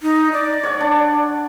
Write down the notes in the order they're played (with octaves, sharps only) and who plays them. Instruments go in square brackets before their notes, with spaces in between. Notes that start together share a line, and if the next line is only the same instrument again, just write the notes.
[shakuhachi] D#4
D5
[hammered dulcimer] C#5 F#5
D4